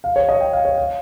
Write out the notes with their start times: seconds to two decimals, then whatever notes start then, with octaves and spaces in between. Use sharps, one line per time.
0.04 F5
0.16 C#5
0.29 D#5
0.41 G5
0.53 F5
0.65 C#5
0.78 F5